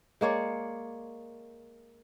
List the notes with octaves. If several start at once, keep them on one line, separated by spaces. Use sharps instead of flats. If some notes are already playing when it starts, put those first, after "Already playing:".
G#3 A#3 C#5 D5